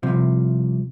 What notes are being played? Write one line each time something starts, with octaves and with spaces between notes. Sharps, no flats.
C2 C3 F3